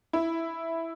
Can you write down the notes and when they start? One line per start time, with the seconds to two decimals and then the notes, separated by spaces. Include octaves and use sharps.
0.13 E4